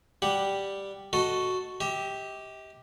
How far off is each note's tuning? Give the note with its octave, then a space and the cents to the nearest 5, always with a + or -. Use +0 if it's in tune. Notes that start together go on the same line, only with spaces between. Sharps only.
G3 +0 G4 +0 F#5 +0
F#4 +0 A4 +0 D#5 +0
G4 +0 D#5 +45